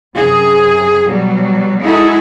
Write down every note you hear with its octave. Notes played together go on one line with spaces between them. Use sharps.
F#2 C3 G#4
B2 F#3 G3
G#3 D#4 E4 F#4 G#4 A4